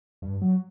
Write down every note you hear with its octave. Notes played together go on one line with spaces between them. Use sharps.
G2
F#3